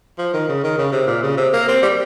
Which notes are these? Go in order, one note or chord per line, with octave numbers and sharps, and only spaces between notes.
F3
D#3
C#3
D#3
C#3
C3
A#2
C#3
C3
A#3
C4
G3